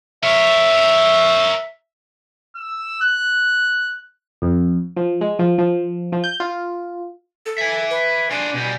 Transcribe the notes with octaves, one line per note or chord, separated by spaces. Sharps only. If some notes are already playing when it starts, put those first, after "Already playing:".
A#4 C#5 E5
E6
F#6
F2
F3
G#3
F3
F3
F3
G6
F4
A4
E5 G#5
B4
D4 F4 G#5
B2 G3